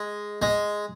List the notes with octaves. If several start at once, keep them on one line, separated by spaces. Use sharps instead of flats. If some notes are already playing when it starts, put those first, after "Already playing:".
Already playing: G#3
G#3